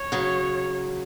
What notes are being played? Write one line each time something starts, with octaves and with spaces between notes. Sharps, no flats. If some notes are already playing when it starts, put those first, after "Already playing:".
Already playing: C#5
C#3 F#3